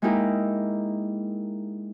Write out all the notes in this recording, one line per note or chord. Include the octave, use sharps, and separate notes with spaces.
G#3 A#3 D#4 E4 G4 A#4